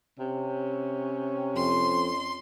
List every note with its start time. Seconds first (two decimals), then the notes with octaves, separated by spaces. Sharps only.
0.19 C3 C#4
1.56 F2 C6